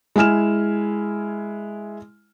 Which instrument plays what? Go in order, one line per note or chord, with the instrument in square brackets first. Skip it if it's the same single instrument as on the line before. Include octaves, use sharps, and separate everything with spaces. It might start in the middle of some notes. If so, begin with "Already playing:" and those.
[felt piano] G#3 E4 G#5 F6 E7